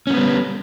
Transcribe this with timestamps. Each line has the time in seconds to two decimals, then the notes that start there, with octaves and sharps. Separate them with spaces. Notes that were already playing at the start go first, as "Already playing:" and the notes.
0.07 C#4
0.10 F#3
0.13 B3
0.17 G3